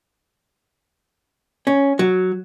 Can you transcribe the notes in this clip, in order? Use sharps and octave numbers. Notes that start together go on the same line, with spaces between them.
C#4
F#3